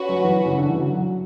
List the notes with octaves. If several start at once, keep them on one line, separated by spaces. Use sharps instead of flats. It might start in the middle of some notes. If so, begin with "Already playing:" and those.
Already playing: C#4 F#4 B4
F#3
E3
C#3
D3
E3
F#3